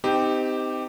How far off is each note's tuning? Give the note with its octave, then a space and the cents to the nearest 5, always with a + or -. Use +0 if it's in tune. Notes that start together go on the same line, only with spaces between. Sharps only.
C4 -30 D#4 +5 G4 +0